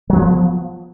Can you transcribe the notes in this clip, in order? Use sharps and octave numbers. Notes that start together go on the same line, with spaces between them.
F3 F#3 B3